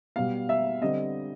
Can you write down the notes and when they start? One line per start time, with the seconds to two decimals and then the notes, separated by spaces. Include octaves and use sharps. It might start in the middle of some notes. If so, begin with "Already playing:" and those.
0.16 B2 G3 B3 F5
0.49 E5
0.81 D3 G3 C4 D#5